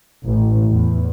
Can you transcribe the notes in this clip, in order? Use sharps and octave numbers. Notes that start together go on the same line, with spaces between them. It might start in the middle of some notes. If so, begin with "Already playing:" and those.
A1
E2